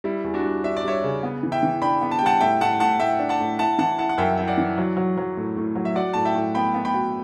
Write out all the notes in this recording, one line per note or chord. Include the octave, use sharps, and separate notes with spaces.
G3 E4
E2
D4 F#4
G3
D4 E5
D5
G3 C#5 E5
C#3
B3
E3
E5 G5
E3
D4 G5 B5
B3
A5
G5
G3 F#5 A5
A2 E5 G5
A2 F#5 A5
A2 F#5 A5
A2 E5 G5
D4
F#5 A5
A2
E4 F#5 A5
E3 F#5 A5
E4 F#5 A5
F#5
F#2 E5 G5
E4 G5
D5 F#5
E3
F#3
F#3
F#3
A2
A2
F#3
E5
F#4 D5 F#5
A2 A5
E5 G5
A2
B3 G5 B5
B3
G5 B5
F#4